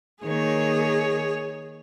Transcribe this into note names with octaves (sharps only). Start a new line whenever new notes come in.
D#3 A#3 G#4 C#5